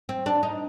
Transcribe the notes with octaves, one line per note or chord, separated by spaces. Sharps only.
C4
D4
D#4